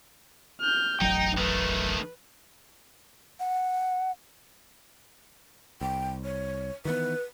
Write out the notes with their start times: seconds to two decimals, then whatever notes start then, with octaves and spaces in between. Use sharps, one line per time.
0.61 F6 G6
1.01 E1 A1 F#3 D#4 G5
1.38 D#3 A3 B4
3.40 F#5
5.81 C2 G5
6.24 C#5
6.85 D#3 E3 B3 B4